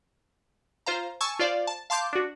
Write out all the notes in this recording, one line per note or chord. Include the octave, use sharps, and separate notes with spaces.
F4 C5 F5 A#5
G#5 A5 C#6 E6
F4 C5 D5 F5
A5
F5 A5 C6 D6 G6
D4 F#4